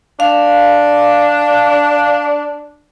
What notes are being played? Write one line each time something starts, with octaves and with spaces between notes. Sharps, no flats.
D4 F5